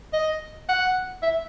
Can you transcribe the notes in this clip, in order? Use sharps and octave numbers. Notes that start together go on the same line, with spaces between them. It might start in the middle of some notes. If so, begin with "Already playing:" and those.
D#5
F#5
E5